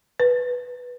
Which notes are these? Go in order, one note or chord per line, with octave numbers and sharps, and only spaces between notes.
B4